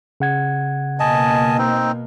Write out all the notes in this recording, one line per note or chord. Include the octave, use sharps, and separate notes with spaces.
C#3 F#5 G#6
B2 A#3 D#5 G#5 A5
C4 D#4